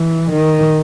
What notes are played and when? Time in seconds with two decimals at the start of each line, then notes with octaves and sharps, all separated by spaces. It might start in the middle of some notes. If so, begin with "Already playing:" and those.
Already playing: E3
0.31 D#3